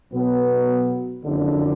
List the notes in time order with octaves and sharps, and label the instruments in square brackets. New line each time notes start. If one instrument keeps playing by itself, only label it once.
[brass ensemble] B1 B2 F#3 B3
F#1 F2 D3